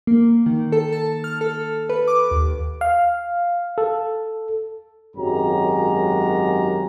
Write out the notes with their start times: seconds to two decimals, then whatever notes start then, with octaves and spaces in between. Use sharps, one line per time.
0.07 A#3
0.46 D#3
0.72 A4
0.92 A5
1.24 F6
1.41 A4
1.89 B4
2.08 D6
2.31 D#2
2.81 F5
3.78 A4
5.16 G#1 F#2 F#3 G#3 G4 A#5